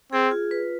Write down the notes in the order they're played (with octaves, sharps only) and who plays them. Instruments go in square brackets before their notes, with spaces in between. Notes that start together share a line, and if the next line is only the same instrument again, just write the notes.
[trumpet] C4 [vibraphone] G#4
[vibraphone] F4
B4